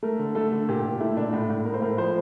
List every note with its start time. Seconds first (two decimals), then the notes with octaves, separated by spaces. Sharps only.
0.03 A3 A#4
0.19 D3
0.35 A3 A4
0.51 D3
0.69 A#2 G4
0.85 A#2
1.00 A3 E4
1.17 A#2 D4
1.33 A2
1.50 A2
1.65 A2 A#4
1.74 C5
1.82 A2 A#4
1.98 F3 C5